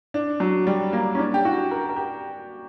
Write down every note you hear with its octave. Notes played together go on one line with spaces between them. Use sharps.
D4
F#3
G3
A#3
C#4
D4
G4
F#4
A#4
A#4
G4